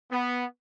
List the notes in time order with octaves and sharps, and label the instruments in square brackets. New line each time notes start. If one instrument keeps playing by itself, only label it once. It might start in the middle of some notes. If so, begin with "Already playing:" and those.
[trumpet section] B3